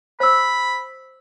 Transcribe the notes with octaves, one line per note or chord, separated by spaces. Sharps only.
C5 B5 E6